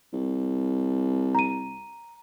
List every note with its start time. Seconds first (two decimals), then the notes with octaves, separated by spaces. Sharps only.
0.13 C2
1.35 A#5 D#7